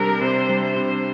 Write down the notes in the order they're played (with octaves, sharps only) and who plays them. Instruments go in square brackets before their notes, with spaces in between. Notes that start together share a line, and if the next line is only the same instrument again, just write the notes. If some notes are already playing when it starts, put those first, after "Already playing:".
Already playing: [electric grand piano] C3 G3 D4 [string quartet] A#4
[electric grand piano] C3 [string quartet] C5
[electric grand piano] G3
[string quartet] C5
[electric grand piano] C3